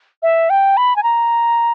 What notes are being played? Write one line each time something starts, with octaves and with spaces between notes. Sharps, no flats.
E5
G5
B5
G#5
A#5